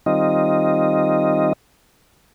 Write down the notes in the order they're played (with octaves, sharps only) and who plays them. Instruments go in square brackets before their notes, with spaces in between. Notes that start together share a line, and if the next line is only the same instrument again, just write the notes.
[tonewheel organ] D#3 G3 C4 D#4 F4 D#5